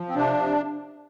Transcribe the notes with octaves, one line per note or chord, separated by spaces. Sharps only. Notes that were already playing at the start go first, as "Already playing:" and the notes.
Already playing: F3
C4
C3 D4
C3